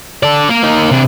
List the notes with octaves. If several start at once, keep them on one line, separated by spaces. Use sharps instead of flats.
A4 D5
A#3 A#4
A#3 D#4
C3 D4